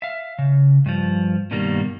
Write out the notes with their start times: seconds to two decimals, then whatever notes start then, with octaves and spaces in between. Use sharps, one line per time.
0.02 E5 F5
0.39 C#3
0.86 G2 F3
1.51 G2 B2 D#3 G3 A#3